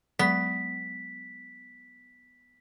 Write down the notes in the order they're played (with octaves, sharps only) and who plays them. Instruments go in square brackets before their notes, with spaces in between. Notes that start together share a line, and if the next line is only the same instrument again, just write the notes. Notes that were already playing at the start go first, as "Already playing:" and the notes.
[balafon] F#3 G#3 [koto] B3 [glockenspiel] B6